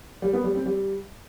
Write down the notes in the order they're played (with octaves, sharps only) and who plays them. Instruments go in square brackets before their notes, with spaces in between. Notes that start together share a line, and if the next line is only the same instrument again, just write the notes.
[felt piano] G3
B3
G3
C4
G3